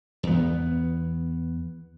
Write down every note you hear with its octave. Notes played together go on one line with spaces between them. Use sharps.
E2 B3